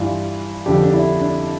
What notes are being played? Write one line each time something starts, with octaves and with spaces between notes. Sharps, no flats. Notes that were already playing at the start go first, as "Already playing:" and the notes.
Already playing: G2 E3 F4
F2 D3 F3 G4
D4
E4
D4